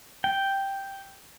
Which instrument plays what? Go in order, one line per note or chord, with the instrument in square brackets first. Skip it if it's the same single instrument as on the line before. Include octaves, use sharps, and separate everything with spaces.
[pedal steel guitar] G5